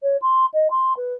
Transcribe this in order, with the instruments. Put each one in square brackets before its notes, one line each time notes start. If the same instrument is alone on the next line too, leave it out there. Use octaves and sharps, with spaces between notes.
[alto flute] C#5
C6
D#5
C6
B4